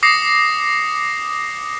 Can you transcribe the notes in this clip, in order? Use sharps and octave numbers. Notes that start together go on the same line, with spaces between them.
D6 D#6 A#6 C7 C#7